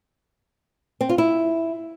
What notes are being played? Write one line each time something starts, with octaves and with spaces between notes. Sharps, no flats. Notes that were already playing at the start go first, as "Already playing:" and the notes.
C4
F4
E4